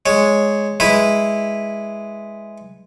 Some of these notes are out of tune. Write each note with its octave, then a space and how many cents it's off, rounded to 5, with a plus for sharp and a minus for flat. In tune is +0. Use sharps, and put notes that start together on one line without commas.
G#3 +0 C#5 +0
G#3 +0 E4 +0 B4 +0